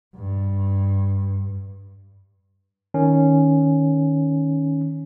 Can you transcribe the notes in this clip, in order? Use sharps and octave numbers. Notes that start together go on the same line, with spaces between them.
G2
D#3 C#4